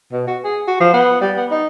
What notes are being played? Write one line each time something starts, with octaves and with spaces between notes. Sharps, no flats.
B2
F#4
G#4
F#4
F3
B3
G3
B3
D#4